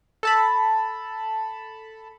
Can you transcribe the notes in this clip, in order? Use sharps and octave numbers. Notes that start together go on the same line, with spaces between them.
A4 A5 B5